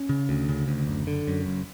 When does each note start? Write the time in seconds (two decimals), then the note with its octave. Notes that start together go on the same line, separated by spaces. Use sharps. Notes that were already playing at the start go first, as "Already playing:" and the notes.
Already playing: C#4
0.09 C#3
0.29 D2
0.49 C#3
0.68 D2
0.87 F#1
1.07 D3
1.27 F#2
1.46 F#1